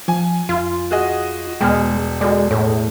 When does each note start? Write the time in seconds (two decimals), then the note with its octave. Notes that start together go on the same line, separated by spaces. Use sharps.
0.08 F3 G#5
0.49 F2 F4
0.91 F#4 G#4 D#5
1.61 E1 B2 G#3 G5 G#5 F6
2.21 G#3 F#4 A4 D5
2.51 A2 G#4 A4 C#5